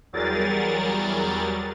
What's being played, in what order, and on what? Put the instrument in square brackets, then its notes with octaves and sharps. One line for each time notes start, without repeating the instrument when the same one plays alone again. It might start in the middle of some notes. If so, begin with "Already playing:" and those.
[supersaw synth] E2 F#3 G3 G#4 A#4 A6